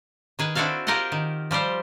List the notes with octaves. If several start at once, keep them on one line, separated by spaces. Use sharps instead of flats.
D#3 G#4 B4
C4 D4 E4 F#4 A4 F5
F4 G4 A#4 C5 D#5 F#5
D#3
F3 G3 G4 C5